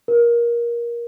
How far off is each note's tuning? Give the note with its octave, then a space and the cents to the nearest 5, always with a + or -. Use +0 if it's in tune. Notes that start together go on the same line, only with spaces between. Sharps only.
A#4 +20